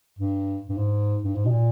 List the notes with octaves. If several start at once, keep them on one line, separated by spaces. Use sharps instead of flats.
G2
G2
G#2
G2
G#2
B2
A#2